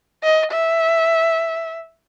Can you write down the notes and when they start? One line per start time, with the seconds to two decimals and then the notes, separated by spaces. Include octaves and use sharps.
0.23 D#5
0.51 E5